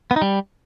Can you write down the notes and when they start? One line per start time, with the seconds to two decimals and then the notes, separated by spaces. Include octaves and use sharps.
0.11 B3
0.16 D#4
0.22 G3